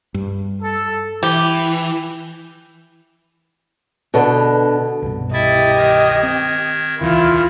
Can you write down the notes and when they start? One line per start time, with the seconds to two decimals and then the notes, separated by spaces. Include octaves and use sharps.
0.14 G2
0.62 A4
1.23 E3 G4
4.14 B2 D3
5.03 C2 G2 B2
5.33 E4 G4 D#5 E5 A6
5.77 D#3 G#6
6.23 C4
7.01 D#1 C#2 A#2 D#3 E3 E4 F4